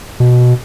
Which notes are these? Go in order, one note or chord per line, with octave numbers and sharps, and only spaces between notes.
B2